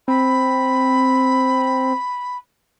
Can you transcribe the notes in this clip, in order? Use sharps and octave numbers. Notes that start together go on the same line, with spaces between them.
C4 B5